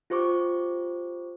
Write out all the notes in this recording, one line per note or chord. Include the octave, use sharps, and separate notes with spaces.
F4 G4 C5 C#6 D6